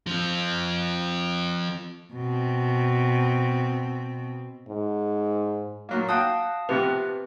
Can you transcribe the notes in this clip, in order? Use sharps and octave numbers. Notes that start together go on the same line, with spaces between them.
F3 C4
B2 C4
G#2
A#2 F#3 A#3
F#4 F5 G5 A5 D#6
C3 F3 B3 C4 G4 B4